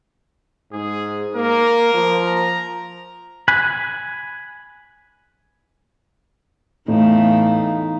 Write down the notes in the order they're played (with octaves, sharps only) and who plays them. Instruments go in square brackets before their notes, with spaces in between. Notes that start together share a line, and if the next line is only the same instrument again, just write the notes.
[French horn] G#2 [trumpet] G#4
[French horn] A#3 [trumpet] A#4
[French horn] F3
[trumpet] A#5
[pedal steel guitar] G#5 B5 F#6
[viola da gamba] E2 E3 A3 [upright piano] A2 [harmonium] D#4 [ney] F5